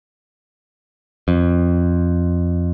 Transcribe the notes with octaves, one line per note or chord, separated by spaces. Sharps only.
F2